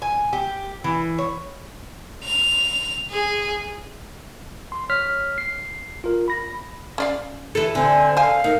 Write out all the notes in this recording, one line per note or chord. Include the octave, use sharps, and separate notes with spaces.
G#5
G4
E3
C#5
F7
G#4
C6
C#5 F6 B6
C7
F4 A#4
B5 A#6
C#4 D5 F5
E3 A4
D3 C4 G#5
A4 C5 F5 G#5
D#4 A#4